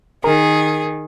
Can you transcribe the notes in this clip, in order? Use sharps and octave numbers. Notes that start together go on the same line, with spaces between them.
D#3 G#4 A#4